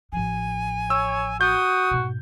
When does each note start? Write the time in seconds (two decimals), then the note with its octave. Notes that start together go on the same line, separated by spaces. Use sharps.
0.12 A1 F3 G#5
0.90 C#5 E6
1.41 F#4 D#6 G6
1.91 G#2 B2